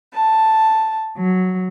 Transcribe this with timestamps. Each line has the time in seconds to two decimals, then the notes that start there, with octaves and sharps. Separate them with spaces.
0.15 A5
1.17 F#3